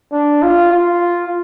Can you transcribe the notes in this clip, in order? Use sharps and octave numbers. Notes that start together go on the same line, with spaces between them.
D4
F4
F4